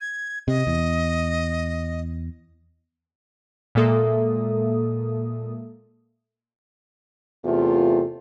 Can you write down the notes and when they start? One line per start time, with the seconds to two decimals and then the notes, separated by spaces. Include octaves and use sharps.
0.01 G#6
0.48 C3 D#5
0.67 E2
3.75 A#2 G#3 A#3 A4 E5 D#6
7.45 E2 C3 A3 F4